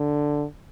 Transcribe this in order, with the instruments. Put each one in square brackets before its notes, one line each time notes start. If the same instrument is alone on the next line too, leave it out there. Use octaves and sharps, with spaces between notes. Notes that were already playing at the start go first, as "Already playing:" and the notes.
Already playing: [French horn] D3